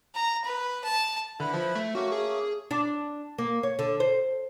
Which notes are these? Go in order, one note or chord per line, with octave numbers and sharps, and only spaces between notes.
A#5
B4
A5
D3 E4 B4 B5
F3
A3
A3 A#3 C#4 F#4
G#4
D4
A#3
C#5
D3
C5